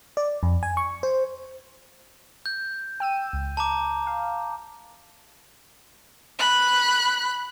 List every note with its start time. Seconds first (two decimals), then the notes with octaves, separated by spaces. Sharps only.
0.17 D5
0.43 F2
0.63 G#5
0.77 C#6
1.03 C5
2.46 G6
3.00 G5 E6 D#7
3.33 C#2
3.57 A5 A#5 D6
4.07 F5
6.39 B5 F#6